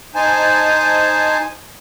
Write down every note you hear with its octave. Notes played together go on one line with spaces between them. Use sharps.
D#4 C5 G#5 A5